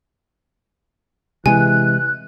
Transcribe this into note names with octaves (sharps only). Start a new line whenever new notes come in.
C3 E3 G#3 G#5 F#6